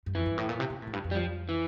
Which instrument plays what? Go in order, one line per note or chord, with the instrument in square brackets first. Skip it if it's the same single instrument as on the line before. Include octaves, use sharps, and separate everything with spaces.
[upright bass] G2
[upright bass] F2 [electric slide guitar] E3
[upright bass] G2
A2
A#2
C3
C3
A2
F2
G2
F2
[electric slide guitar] G3
F3
E3